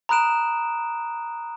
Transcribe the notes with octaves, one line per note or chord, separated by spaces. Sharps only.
A#5 B5 D#6 F#6 D7 E7